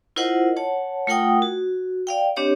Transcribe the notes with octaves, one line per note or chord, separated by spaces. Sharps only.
E4 F4 A#4 C5 D#5 F#5
C#5 F#5 A5
A3 F4 A#4 F#5 G5 D#6
F#4
D5 F5 G5
C4 D4 G4 C#5 D#5